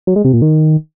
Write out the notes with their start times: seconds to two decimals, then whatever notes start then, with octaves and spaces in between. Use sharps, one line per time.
0.07 F#3
0.16 G#3
0.25 C3
0.33 A#2
0.42 D#3